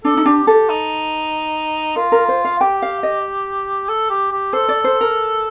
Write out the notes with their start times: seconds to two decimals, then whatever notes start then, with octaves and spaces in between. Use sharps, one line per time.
0.04 D4 A4
0.17 D#4
0.26 D4 G4
0.47 G4 A4
0.69 D#4
1.96 F4 A#4
2.12 A#4
2.28 C5
2.45 F5
2.61 G4 G5
2.82 F5
3.03 D#5
3.88 A4
4.10 G4
4.32 G4
4.53 A4 C5
4.69 D5
4.84 C5
5.01 A#4